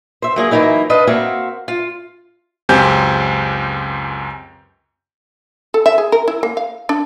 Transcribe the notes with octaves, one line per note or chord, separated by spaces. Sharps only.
C5 E5
F#3 A#3 G#4
E3 F#3 A#3 D#4 E4
D4 B4 D#5 F5
A#3 C4 F#4 E5 F5
F4
C#2 F#2 C4 G4 G#5 G6
A4
E5
G#4
A#4
E4
A#3
F5
D4